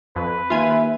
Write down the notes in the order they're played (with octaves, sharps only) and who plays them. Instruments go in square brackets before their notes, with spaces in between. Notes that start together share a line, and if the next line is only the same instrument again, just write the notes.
[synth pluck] F2 [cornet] B4
[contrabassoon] D#2 [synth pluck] F4 G#5 [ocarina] E5